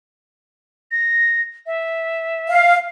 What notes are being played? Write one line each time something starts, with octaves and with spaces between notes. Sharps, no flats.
A#6
E5
F5